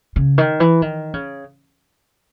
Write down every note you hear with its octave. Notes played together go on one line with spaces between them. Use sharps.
C#3
D#3
E3
D#3
C#3